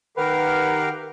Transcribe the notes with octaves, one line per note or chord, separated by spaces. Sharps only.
D#3 G4 A#4 B4 F5 F#5